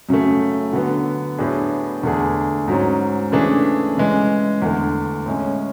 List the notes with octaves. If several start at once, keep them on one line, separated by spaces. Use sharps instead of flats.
F#2 C#3 F#3 A3
D3 F#3 B3
A2 F#3 B3 D4 G#4
E2 D3 A3 D4 G#4
G#2 F#3 C#4
C#3 E3 A3 D4 G#4
C#3 E3 G#3
E2 D3 A3
A2 G#3 C#4